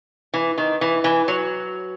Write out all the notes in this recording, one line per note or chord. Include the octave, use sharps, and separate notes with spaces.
E3
D#3
E3
E3
F#3